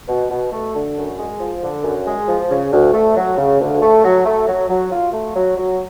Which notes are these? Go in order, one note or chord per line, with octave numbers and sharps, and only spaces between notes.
B2
B2
A3
D3
F#2
G#3
F3
D3
F#2
G#3
F3
C#3
D2
A3
F#3
C#3
D2
A3
F#3
A3
F#3
F#3
F4
A3
F#3
F#3